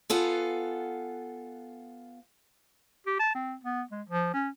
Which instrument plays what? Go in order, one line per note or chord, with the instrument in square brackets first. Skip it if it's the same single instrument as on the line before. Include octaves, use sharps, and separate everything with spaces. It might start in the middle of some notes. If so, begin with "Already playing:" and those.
[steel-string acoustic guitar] B3 F4 A4 F5 F#5 G#5
[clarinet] G4
A5
C4
B3
G#3
F3
C#4